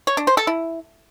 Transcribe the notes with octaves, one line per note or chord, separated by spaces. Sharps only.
C#5
D4
C5
A4
E4